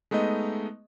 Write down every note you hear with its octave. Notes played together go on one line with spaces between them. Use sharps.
G#3 A3 B3 D#4 D#5